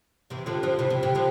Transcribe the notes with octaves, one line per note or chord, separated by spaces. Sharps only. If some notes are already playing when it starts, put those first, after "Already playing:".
C3 E3
D3 F3
D3 F3
C3 E3
C3
C3 E3
D3 F3